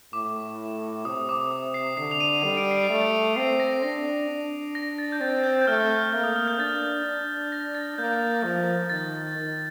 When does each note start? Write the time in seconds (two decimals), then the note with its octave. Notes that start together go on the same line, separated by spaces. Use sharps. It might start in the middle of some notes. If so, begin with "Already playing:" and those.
0.13 A2 D6
1.05 C3 D#6
1.29 D6
1.51 D#6
1.74 C7
1.97 D3 C7
2.11 F7
2.20 D#7
2.43 G3 D#7
2.57 D7
2.71 C7
2.83 D7
2.90 A3
3.36 C4 C7
3.60 A#6
3.82 D4 A#6
4.29 D4
4.75 A#6
4.98 A6
5.12 G6
5.20 C4 A6
5.44 G6
5.61 G6
5.67 A3 F6
6.14 A#3
6.24 D#6
6.36 F6
6.48 G6
6.59 D4 A6
7.05 D4
7.52 A#6
7.75 A6
7.98 A#3 G6
8.44 F3
8.90 D#3 A6
9.36 D#3